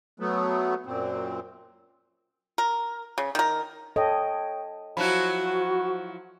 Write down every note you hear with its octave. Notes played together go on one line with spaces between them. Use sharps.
F#3 A3 B3
F#2 A#2 C4
A#4
C#3
D#3 A#4
A4 C#5 D#5 G5
F3 F#3 E4 F#4 B5 F#6